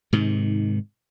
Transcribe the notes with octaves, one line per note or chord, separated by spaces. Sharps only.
G#2 C3 D#3